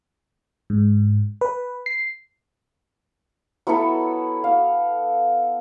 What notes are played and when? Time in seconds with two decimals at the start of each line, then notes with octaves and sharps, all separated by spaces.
0.70 G#2
1.41 B4
1.86 C7
3.67 F#3 B3 E4 A4
4.44 F5